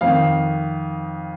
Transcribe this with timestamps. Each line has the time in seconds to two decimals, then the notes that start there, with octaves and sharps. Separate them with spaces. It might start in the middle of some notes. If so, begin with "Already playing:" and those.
0.01 F2 D#3 F5